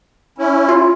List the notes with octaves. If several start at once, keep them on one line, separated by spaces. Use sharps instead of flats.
C#4 E4
F4